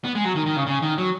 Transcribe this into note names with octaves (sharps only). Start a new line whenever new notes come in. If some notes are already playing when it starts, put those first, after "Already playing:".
B3
G#3
F#3
D#3
D#3
C#3
C#3
D#3
F#3